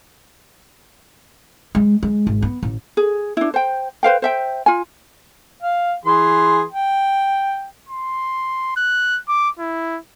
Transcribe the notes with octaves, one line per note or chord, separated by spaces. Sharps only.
G#3
G#3
G#1
B3
A1
G#4
D4 E4
C5 G5
B4 C5 F5 G5
C5 E5 G5
F4 G#5
F5
E3 G#4 C6
G5
C6
F#6
D6
E4